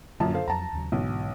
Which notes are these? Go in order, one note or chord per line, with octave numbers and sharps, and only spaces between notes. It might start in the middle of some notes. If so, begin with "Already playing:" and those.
A#1 F#2 D3 A5
A4 C5 F5
F2 F#3 A5 A#5
D#2 C#3 F#3
B1 G#2 D3 E3